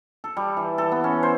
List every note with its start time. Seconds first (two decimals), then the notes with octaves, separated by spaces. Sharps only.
0.24 A4
0.37 G3
0.57 E3
0.78 A4
0.92 B3
1.04 C#4
1.23 C5